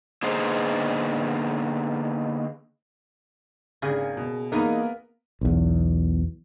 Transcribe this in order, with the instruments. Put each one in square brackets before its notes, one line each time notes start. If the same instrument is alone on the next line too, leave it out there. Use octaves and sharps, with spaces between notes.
[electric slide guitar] D3 A#3 B3 D#4 G#4 C5
[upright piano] G#1 [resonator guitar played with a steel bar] C#3 A#3 G#4
[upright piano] B2
[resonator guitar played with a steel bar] E3 G#3 D#4 [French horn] A#3 [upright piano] B3 A#4 B5
[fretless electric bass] B1 E2